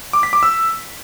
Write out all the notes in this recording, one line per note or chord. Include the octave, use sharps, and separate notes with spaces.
D6
B6
D6
E6